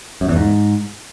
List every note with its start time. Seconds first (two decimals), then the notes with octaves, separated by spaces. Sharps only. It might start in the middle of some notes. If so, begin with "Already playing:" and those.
0.21 F#2
0.29 E2
0.36 G#2